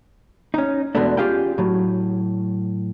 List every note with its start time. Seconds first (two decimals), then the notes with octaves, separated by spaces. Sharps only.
0.54 C#4 D#4
0.95 E2 B2 G#3 A3 B3 D4
1.17 C#4 F4 G4 G#4 F5 G5
1.58 A2 F#3